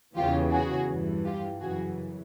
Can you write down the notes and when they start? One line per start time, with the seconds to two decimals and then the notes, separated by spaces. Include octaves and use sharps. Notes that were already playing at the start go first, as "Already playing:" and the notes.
0.16 E2 C#3 E3 F4 G4
0.52 F#4 G#4
0.88 G2 E3
1.25 F4 G4
1.62 F#2 C#3 E3 F#4 G#4